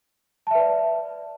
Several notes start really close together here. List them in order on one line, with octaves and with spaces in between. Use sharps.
A5 E5 B4 D5